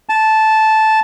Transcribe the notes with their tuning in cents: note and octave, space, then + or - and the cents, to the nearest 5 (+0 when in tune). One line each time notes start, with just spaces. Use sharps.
A5 -10